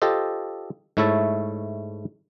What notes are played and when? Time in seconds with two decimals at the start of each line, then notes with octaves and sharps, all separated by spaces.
0.02 F4 G4 A4 C5 D#5
0.97 G#2 A3 E4 C#5 E5 A5